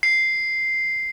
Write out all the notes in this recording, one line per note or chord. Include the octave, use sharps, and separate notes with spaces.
C7